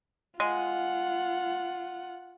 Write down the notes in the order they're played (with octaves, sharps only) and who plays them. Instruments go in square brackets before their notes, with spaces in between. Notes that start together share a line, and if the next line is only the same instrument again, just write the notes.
[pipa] G#3 [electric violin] F4 F#5